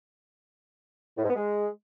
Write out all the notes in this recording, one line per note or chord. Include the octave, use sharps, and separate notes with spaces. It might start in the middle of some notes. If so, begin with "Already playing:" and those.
A2
G#2
B3
G#3